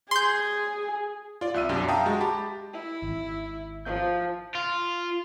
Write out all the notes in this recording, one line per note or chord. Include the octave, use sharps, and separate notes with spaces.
G#4 C6 G6
F4 D5
C2 E5 E6 D#7
B1 F#2 D4 G4
E5 F5 G5 A5 A#5 D#6
G#3 F#4
G4 A5 B5
E4
G#1
F3 G6
F4